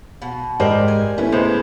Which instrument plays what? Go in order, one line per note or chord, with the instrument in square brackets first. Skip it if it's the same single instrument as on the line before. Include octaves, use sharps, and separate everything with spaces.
[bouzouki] B2
[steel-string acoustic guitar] G#2 [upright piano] G4 [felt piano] A#4 C5 D#5 [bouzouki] D5
[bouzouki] G#5
[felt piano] A3 B3 C#4 [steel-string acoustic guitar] E4
[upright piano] C#2 C5 [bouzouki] G#3